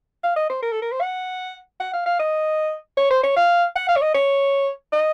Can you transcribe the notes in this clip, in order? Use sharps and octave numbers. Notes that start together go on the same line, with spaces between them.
F5
D#5
C5
A#4
A4
A#4
C5
F#5
F#5
F5
F5
D#5
C#5
C5
C#5
F5
F#5
F5
C#5
D#5
C#5
D#5